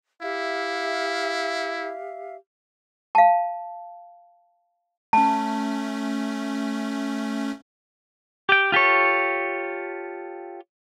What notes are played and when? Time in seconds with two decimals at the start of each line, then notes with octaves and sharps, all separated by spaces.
0.22 E4 G4 E5 F5
3.15 F5 A5
5.13 A3 C#4 A5
8.49 G4 G5
8.72 F4 G4 A4 C#5